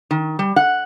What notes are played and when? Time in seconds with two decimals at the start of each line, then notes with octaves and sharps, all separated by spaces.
0.11 D#3
0.39 G3
0.56 F#5